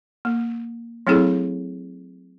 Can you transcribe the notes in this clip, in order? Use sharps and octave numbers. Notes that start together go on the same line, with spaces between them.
A#3
F#3 A3 C4 E4 G#4 A4